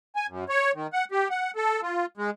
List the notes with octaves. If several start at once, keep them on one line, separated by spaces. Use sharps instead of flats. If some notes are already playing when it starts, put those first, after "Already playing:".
G#5
F#2
C#5
D#3
F#5
G4
F#5
A4
F4
G#3